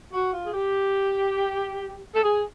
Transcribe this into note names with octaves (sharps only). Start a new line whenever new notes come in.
F#4
F4
G#4
G4
A4
G#4